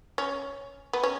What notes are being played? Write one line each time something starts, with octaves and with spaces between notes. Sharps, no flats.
C#4
B3
C#4